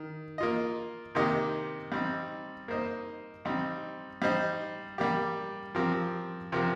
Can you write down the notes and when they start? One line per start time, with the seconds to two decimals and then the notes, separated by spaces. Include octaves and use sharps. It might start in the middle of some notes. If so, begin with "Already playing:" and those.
Already playing: D#3
0.38 A#3 F4 D#5
1.15 C3 D#3 A#3 G4 D#5
1.92 G3 C4 D#4
2.68 A#3 D#4 C5 D#5
3.45 G3 C4 D#4
4.22 G3 D#4 C5 D#5
4.98 G3 A#3 G4
5.75 F3 C4 G4 A#4
6.52 C3 F3 C4 G4 A#4